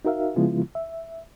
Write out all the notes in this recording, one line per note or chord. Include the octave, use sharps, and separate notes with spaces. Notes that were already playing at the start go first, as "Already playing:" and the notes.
D#4 F#4 A#4 E5 F5
C#3 F3 G#3 B3 E4 F4
E5